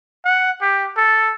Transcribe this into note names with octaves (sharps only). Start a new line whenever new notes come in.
F#5
G4
A4